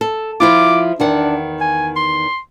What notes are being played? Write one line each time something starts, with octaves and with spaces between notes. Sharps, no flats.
A4
F3 E4 F4 D6
E2 D#3 D4 F#5
G#5
C6